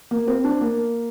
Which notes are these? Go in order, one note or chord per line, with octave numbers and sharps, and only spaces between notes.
A#3
C4
D4
A#3